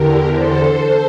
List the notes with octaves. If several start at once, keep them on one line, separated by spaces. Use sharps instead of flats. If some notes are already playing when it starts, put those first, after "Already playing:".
Already playing: E2 D3 G4 A#4
A4 C5